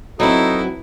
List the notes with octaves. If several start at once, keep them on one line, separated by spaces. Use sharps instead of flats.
F#3 B3 C4 D#4 E4 F#4 A4